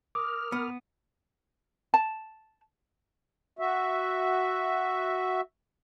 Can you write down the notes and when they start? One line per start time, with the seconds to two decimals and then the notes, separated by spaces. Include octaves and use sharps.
0.15 A#4 D6 D#6 F6
0.52 B3
1.94 A5
3.59 F#4 E5